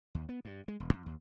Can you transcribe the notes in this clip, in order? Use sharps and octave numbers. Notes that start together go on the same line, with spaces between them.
D#2
B3
G2
G#3
E1
F2
D#2